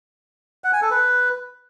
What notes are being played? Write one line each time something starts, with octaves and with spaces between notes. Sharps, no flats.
F#5
G#5
A4
B4